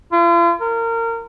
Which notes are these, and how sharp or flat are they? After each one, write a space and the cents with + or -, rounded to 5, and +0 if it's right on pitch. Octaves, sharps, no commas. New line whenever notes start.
F4 -40
A#4 -25